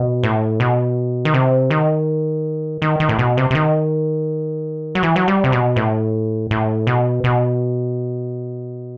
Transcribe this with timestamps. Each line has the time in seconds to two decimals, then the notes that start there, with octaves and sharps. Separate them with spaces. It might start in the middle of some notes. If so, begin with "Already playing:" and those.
Already playing: B2
0.23 A2
0.60 B2
1.25 D#3
1.34 C3
1.70 D#3
2.82 D#3
3.00 D#3
3.09 A2
3.19 B2
3.37 C3
3.51 C3
3.55 D#3
4.95 F#3
5.03 E3
5.16 F#3
5.28 G3
5.44 C3
5.52 B2
5.76 A2
6.51 A2
6.87 B2
7.24 B2